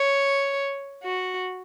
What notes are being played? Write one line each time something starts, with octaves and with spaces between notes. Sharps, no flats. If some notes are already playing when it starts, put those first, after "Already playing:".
Already playing: C#5
F#4